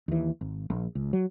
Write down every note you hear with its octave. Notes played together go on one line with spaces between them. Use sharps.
D#2 E3
G#1
A#1
C#2
F#3